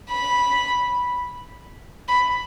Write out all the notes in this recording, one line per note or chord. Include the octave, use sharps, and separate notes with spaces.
B5
B5